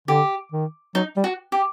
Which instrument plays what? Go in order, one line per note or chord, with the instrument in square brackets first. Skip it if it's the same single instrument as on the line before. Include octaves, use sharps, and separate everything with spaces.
[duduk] D3 [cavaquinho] G4
[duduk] D#3
[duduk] F#3 [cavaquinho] D#4
[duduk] G3
[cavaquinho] F#4
G4